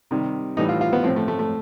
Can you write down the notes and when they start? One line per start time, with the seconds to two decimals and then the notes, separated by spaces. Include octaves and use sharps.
0.11 C3 D#3 G3
0.57 A2 E3 G3 D#4
0.69 F4
0.81 F4
0.93 B3
1.04 A2 F3 C4
1.16 A3
1.28 A3
1.39 A3